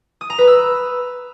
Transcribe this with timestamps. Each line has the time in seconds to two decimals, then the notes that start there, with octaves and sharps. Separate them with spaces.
0.21 D#6
0.30 A#5
0.39 B4
0.47 E6